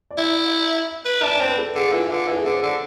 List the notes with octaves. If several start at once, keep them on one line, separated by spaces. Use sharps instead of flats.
D5
E4 E5
B4
D4 E5
D5
C4 C5
B4
A4
D3 G#4
E3 F4
D3
E3 A4
G#4
D3 A4
C5
D3 D5